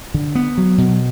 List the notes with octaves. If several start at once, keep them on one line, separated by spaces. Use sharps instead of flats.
D3
B3
F#3
B2